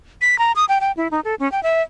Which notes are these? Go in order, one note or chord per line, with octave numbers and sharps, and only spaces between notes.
B6
A#5
D#6
G5
G5
E4
D#4
A4
C#4
G5
E5